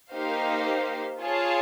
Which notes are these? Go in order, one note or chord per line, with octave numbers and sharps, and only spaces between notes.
A#3 D#4 G4 C5 F5
F4 G#4 C#5 F5 A5